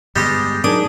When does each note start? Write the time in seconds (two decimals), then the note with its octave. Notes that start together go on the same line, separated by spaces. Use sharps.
0.16 G2 D3 G3 G#3 B3 G4 G6
0.64 F#3 D4 D#4 G#4 A#4 D6 D#6